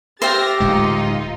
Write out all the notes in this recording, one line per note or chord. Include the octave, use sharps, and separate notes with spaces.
G4 C5 E5 G5 F6 A6 A#6
D1 A2 G#3 D#4 F4